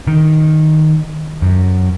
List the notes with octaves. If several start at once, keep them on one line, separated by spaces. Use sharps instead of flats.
D#3
F#2